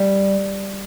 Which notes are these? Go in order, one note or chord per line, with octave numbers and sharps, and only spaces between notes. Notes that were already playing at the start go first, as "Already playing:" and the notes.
Already playing: G3